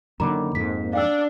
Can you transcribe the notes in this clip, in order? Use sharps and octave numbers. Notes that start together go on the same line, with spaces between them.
F#2 D3 D#3 A#3 A#5 B5 D6
F2 G#2 B6
D4 F5 G5 E6